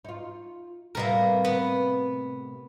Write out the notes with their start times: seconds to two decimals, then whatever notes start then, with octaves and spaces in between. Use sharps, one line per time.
0.05 D#4 F4
0.95 A2 C3 G3 A#3 B3 A#4
1.44 B3